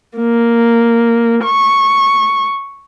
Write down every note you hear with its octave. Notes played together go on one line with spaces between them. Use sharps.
A#3
C#6